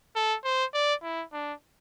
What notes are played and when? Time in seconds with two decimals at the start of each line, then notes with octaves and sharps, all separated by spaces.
0.15 A4
0.44 C5
0.74 D5
1.03 E4
1.33 D4